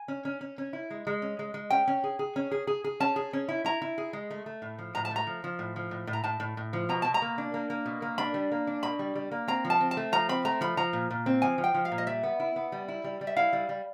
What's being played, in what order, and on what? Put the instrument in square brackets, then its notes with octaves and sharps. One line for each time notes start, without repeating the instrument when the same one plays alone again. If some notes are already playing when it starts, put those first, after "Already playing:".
Already playing: [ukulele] G#5
[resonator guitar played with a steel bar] C#4
C#4
C#4
C#4
E4
G#3
G#3
C#4
G#3
G#3
[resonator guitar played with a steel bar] C#4 [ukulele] G5
[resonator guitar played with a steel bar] C#4
G#4
G#4
C#4
G#4
G#4
G#4
[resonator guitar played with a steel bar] C#4 [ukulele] A5
[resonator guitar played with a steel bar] G#4
C#4
E4
[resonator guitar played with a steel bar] E4 [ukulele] A#5
[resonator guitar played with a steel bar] E4
G#4
G#3
A3
A3
A2
F3
[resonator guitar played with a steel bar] A2 [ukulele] A#5
[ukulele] A5
[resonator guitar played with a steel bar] A3 [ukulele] A#5
[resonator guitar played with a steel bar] F3
F3
A2
F3
A2
A2
[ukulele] A#5
[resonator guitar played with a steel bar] A2 [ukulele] A5
[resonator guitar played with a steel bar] A2
A2
F3
[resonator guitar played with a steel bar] B2 [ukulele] A#5
[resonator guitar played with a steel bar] B2 [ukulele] A5
[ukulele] A#5
[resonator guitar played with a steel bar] A#3
D4
A#3
A#3
B2
A#3
[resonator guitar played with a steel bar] D4 [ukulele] B5
[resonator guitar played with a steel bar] G3
A#3
D4
[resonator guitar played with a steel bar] B2 [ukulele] B5
[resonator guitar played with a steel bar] G3
G3
A#3
[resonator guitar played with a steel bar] C4 [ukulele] A#5
[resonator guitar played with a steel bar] F3
[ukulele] A5
[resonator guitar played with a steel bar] C4
[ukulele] A5
[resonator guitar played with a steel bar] A3
[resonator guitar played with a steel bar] F3 [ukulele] A#5
[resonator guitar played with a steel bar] C4 [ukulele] B5
[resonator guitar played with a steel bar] A3 [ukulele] A#5
[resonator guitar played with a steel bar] F3 [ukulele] B5
[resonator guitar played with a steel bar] F3 [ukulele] A#5
[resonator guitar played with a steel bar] A#2
A#2
C4
[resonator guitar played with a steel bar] F3 [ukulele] G#5
[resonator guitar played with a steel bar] F3
[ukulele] G5
[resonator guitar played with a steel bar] F3
[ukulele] F5
[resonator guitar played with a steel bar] A#2
[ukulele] D#5
[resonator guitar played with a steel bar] G3 [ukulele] E5
[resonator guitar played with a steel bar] B3
E4
B3
G3
E4
G3
G3
[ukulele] E5
[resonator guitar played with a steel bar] E4 [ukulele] F5
[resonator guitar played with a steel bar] G3
G3